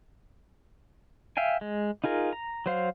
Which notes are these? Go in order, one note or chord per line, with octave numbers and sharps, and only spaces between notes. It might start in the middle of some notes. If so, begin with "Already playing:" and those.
E5 F5 G5 G#5
G#3
D#4 F4 G#4 A#4
A#5
F#3 C5 F5